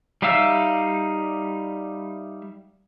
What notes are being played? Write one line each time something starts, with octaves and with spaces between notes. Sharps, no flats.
G3 D#4 E5 F5 E6